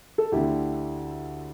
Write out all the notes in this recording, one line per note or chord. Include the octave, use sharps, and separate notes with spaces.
A4
D2 D3 E4 G4